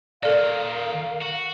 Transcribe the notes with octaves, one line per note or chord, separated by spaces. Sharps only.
A#2 D#3 A4 A#4 D5 F5
F#4